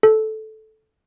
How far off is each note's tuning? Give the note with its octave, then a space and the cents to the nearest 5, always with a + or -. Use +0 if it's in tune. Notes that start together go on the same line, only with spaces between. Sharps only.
A4 -10